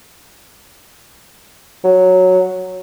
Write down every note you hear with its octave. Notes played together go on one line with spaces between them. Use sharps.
F#3